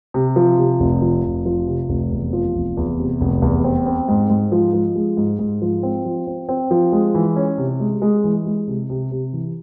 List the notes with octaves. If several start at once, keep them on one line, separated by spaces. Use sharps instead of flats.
C3
F3
C3
F1
F3
F1
F3
C3
F1
E2
F3
F1
E2
C3
F1
E2
C4
C4
G#2
G#2
F3
F3
G#3
G#2
G#2
F3
C4
F3
C4
C4
F3
G#3
E3
C#4
C3
G#3
G#3
E3
G#3
C3
C3
C3
E3